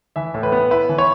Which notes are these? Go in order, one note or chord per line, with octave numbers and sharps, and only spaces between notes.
E3 E5
A2
B4
B3
E4 B4
E3
C#5